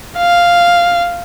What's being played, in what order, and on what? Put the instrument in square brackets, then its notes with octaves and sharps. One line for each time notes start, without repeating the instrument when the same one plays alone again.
[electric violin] F5